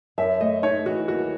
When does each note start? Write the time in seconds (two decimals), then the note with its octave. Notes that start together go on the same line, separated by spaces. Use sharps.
0.18 F#2 E5
0.40 A3 D#5
0.63 D#4 C#5
0.86 E3 F#4
1.08 D#2 F#4